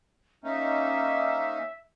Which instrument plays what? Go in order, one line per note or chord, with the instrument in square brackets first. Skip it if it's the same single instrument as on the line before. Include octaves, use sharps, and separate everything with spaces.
[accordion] A#3 C#4 D#4 [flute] E5